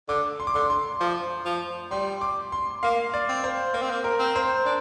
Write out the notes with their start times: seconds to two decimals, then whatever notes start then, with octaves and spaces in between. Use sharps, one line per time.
0.09 D3 D6
0.40 C6
0.47 D6
0.55 D3 C6
0.70 C6
1.00 F3
1.45 F3
1.91 G3 C6
2.21 D6
2.52 C6
2.83 A#3 F5
3.14 D5
3.29 C4
3.44 C5
3.74 A#3 C5
3.82 C4
3.90 A#3
4.04 A#4
4.19 C4
4.36 C5
4.65 D4